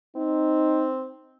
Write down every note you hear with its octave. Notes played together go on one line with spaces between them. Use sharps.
C4 D#4